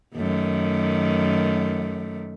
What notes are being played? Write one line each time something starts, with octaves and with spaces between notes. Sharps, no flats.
F#2 D#3 A3